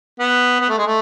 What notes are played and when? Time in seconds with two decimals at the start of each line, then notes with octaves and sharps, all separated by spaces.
0.20 B3
0.60 B3
0.69 A3
0.77 G#3
0.86 A3